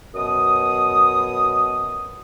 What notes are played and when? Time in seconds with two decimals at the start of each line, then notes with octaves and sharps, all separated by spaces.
0.15 F#2 B2 D#6